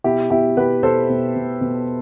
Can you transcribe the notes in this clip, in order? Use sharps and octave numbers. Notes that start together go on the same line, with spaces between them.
B2 E4 G4
B2 E4 G4
B2 G4 B4
B2 A4 C5
B2
B2
B2